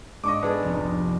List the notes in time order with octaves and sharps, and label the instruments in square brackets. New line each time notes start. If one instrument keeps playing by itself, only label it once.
[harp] G#2 [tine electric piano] G#3 D4 [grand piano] D#5 C#6 D6
[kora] B3 G#4 A4 [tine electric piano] D4
[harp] F1 C2